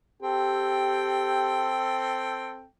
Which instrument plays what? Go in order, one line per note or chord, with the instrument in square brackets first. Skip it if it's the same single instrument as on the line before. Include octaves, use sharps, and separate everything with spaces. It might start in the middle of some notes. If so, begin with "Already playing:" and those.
[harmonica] C4 A4 G5 [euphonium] G4